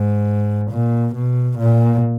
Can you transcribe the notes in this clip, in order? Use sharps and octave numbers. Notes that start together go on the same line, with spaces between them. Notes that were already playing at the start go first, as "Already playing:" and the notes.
Already playing: G#2
A#2
B2
A#2